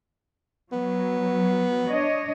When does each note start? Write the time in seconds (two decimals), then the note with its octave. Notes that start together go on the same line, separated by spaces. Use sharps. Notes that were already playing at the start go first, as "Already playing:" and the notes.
0.72 F#3 B3
1.89 D4 C#5 D#5